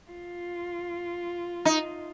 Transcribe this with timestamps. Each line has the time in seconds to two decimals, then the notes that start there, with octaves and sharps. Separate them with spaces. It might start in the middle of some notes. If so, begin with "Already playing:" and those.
0.11 F4
1.65 D#4